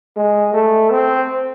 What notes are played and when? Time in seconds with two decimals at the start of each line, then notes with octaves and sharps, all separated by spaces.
0.17 G#3
0.53 A3
0.91 C4